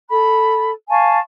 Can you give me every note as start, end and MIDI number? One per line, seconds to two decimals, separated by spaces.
0.08 0.70 69
0.08 0.70 83
0.89 1.18 77
0.89 1.18 80
0.89 1.18 81
0.89 1.18 85